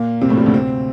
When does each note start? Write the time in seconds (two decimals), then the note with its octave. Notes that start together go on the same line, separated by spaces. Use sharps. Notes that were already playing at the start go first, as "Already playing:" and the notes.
Already playing: A#2 A#3
0.21 C3 C4
0.29 A2 A3
0.37 G2 G3
0.46 D2 D3
0.53 C3 C4